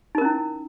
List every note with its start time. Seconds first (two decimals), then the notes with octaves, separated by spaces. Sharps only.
0.15 D#4
0.18 A#4
0.21 C#4
0.25 E4